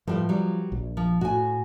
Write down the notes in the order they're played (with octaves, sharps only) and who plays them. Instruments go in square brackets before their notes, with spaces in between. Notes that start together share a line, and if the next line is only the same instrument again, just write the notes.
[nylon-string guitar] A2 G3 B4 [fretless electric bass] F3
[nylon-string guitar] F#3 G3
[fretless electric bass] A#1
[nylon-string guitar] F3
[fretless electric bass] A2 [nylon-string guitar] F#4 G#5